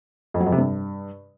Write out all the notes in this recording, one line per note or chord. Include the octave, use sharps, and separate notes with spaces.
F2
F#3
F2
C3
G2